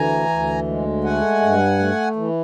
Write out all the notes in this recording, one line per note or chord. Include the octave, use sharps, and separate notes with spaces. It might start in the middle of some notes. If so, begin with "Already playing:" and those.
Already playing: D2 E3 G#5 A#5
D2
G#3
A3 F#5 G#5
G2
A3
E3